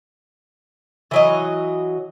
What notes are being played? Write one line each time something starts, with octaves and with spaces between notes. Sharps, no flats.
E3 F#3 D#5